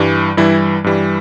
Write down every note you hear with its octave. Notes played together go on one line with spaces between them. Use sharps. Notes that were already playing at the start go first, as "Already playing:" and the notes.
Already playing: G2 E3 G3
G2 E3 G3 E4
G2 E3 G3